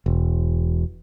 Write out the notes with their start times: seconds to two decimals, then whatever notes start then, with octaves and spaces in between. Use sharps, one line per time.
0.06 E1